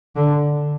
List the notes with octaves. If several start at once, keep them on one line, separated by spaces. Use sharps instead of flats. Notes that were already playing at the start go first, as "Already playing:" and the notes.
D3